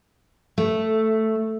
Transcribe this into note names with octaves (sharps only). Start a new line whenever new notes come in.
A3